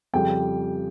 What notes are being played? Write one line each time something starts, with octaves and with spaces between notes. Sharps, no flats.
F2 C#3 G3 G5